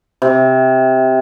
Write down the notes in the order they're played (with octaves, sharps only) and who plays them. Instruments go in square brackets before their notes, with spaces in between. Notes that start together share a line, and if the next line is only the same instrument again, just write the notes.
[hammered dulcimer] C3